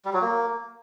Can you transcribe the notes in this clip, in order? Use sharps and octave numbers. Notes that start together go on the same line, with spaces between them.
G3
F#3
A#3